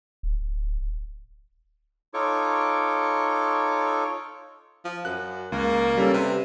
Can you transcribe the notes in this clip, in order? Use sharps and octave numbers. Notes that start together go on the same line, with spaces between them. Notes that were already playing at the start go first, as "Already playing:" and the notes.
D1
D#4 F4 A4 C#5 C#6 D6
F3
F#2 F#6
C#2 A#3
G3 C#4 A4
C3 B4